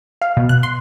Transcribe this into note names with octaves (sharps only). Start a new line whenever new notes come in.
F5
B2
F#6
C6